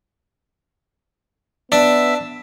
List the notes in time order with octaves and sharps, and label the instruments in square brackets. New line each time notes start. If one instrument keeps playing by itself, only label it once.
[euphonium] B3 [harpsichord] D4 [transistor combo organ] E5